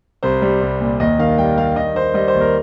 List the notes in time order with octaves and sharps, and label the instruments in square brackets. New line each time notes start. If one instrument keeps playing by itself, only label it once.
[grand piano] C2 C5
G3
C2
A#2
D#2 D#5
D#3 F5
G3 G5
G3 F5
D#3 D#5
D#3 C5
G3 D#5
C5
D#2
A#4